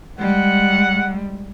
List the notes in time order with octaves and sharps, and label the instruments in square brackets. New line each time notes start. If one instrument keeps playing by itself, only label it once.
[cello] G3 G#3 [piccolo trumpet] F#5